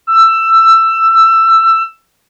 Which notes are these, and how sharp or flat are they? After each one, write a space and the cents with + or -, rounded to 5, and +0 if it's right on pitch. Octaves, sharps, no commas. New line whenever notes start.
E6 +15